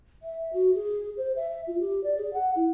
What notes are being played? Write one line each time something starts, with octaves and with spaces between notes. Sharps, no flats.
E5
F#4
G#4
C5
E5
E5
F4
G4
D5
G#4
F#5
E4